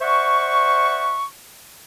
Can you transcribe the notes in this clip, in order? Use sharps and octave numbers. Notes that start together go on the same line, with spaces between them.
C5 D5 E5 F#5 C#6